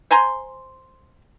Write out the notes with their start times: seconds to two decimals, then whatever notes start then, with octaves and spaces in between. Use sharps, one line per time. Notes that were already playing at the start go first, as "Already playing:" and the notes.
0.11 C5 G#5 A#5 C6